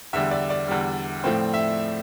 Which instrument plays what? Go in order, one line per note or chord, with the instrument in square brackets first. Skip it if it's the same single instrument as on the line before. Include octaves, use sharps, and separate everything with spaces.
[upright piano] E2 D3 G3 E5
D5
D5
E2 D3 G3
A2 F3 A3 C4
E5